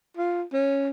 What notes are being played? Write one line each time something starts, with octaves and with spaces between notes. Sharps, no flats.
F4
C#4